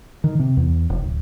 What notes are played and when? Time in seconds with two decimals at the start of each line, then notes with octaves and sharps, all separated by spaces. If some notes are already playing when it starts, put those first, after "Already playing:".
0.24 D#3
0.39 C3
0.57 E2
0.90 F1
1.04 D1